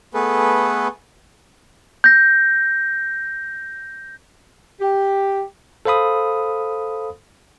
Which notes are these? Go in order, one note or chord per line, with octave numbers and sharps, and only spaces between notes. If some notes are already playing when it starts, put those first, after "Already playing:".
A3 B3 G#4 A4 B4
G6 A#6
G4
A4 C5 F5 B5 D#6